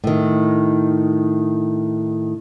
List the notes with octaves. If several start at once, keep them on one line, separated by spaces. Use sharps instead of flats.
A2 D#3